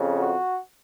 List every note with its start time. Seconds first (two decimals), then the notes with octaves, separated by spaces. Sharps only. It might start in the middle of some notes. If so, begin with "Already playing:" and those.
Already playing: F2 C#3
0.17 F#4